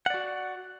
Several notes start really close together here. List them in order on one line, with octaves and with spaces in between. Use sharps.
F#5 D5 F#4